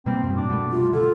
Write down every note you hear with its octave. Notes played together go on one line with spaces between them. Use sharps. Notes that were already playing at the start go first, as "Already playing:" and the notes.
B2 G3 A#3 C4
F#2 A2 C4
D4
B2 G3 A3
C3 F4
D3 F4 A4